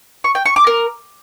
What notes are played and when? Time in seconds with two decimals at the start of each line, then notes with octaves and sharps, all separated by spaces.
0.24 C#6
0.35 G5
0.46 C#6
0.56 D6
0.67 A#4